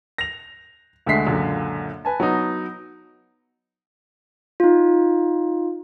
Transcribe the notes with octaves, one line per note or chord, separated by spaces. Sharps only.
A#6 F7
D2 D3 G#3 A3 B6 C7
C#2 F#2 A#2 D3
B4 G#5 A5
F#3 B3 D#4
D#4 F4